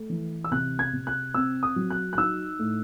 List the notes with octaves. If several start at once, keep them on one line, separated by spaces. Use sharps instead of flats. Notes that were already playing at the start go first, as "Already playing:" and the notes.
Already playing: A3
E3
E6
C3 F#6
G#6
C3
F#6
C4 E6
D#6
F#3
F#6
F#6
D#4 E6
A2